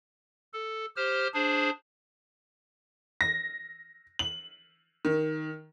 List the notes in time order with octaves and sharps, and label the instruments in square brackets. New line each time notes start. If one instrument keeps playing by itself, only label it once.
[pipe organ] A4
G4 C5 F6
D4 G#4 C5
[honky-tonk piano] A#6
F#7
D#3